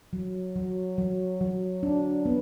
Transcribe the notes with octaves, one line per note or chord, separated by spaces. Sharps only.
F#3
F#3
F#3
F#3
D4
B3